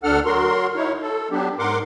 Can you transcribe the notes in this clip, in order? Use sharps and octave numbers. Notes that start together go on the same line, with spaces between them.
D2 D4 A4 F#5 F6
F#3 F#4 A#4 C6
D#4 E4 C#5
A4
F#3 B3 D4 G4
G#2 A#4 F#5 C6 D6